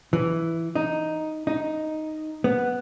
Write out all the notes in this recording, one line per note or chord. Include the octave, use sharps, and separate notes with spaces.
E3
D#4
D#4
B3